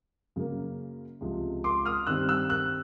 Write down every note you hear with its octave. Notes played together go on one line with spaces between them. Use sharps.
F#2 C#3 F#3 A#3
C#2 C3 F3 G#3
C6 D6
D#6 F6
G2 D#3 G3 C4 E6 F#6
E6 F#6
E6 F#6